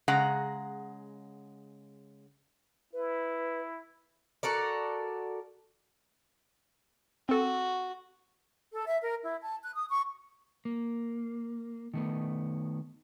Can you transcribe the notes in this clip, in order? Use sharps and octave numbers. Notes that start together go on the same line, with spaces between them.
C#3 G#3 F#5 A#5
E4 B4
F#4 A4 A#4 D5
C4 F#4 A4
A4
E5
A#4
E4
A5
F#6
D#6
C#6
A#3
D#3 A3 B3